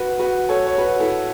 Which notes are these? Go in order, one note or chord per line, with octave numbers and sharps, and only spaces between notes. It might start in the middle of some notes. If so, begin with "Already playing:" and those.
Already playing: F#4 B4
F#4 B4
A4 C#5
C#5
F#4 B4
E4 A4